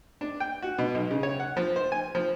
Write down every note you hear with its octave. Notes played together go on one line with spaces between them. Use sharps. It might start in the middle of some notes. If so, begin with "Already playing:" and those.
D4
G5
F#4
B2
B1
C#3
C#5
F#5
F3
C5
G#5
F3